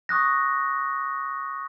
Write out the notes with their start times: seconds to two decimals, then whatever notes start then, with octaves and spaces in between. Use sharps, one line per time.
0.09 C#6 D#6 F#6 A#6